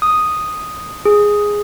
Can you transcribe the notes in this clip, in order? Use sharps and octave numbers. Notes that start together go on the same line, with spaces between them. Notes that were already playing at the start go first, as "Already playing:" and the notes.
D#6
G#4